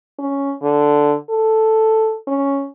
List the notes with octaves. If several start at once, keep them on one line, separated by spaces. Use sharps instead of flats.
C#4
D3
A4
C#4